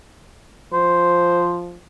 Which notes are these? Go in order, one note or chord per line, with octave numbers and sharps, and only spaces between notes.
F3 C5